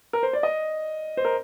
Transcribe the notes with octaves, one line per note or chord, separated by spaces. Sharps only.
A#4
C5
D5
D#5
C5
A#4